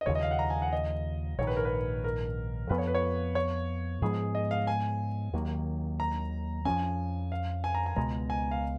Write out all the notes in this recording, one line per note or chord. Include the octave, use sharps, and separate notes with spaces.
D#5
D#2 C#3 F3 C#5
D#5
F5
F#5
A#5
G#5
F#5
D#5
A#1 G#2 D#3 C#5
B4
A#4
B4
A#4
F2 F3 B3 B4
C#5
B4
C#5
C#5
G#2 F3 G#3 B3 G#4
D#5
F5
G#5
D#2 D#3 F#3 A#3
A#5
F2 F3 G#3 C#4 G#5
F5
G#5
A#5
G#5
C#2 B2 G#3 A#5
G#5
F5